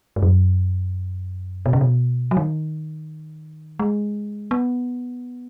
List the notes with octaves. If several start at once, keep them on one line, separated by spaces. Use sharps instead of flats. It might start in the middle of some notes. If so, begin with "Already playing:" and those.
G#2
F#2
B2
C#3
B2
F#3
D#3
G#3
B3